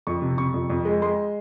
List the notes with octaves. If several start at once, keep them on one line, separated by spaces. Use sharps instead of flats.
F2 C#6
C3
C3 C#6
F2
F2
G#3
G#3 C6